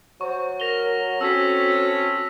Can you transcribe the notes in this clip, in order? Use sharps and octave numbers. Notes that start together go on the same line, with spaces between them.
F#3 C5 C#6
A#4 A#6 F7 G7
C4 C#4 F#4 A4 E6 B6